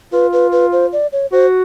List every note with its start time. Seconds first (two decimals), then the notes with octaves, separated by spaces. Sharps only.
0.13 F4 B4
0.33 B4
0.52 B4
0.72 C5
0.93 D5
1.12 C#5
1.32 F#4 C5